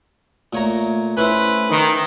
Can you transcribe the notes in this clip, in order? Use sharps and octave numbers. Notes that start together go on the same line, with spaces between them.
A#2 A3 C#5 A#5
C#4 E4 B4 C5
D#3